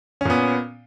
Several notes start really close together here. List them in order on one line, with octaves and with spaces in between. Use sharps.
C#4 A#2 B3